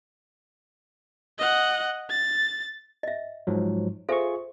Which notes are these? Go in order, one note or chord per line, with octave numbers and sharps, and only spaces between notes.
D#5 F#5
A6
D#5 E5
G#2 F3 F#3
F4 G#4 A4 C5 E5 C#6